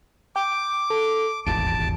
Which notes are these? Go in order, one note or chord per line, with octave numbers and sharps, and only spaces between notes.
G5 D6
A4
D#1 G#1 E2 A5 D7